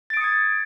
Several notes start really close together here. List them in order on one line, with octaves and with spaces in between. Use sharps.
A6 D7 D#6 C#7 G#6